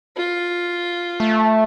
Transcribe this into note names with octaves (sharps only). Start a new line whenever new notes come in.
F4
A3